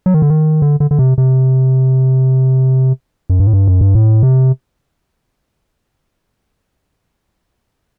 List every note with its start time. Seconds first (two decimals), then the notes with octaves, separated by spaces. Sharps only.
0.06 F#3
0.14 D#3
0.22 D3
0.30 D#3
0.62 D3
0.80 D3
0.91 D3
0.99 C3
1.18 C3
3.30 F#2
3.40 G2
3.47 A2
3.53 G2
3.68 F#2
3.81 G2
3.95 A2
4.23 C3